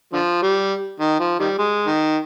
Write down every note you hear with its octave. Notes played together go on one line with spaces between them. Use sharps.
D3 F3
G3
D#3
F3
D#3 G3
G#3
D#3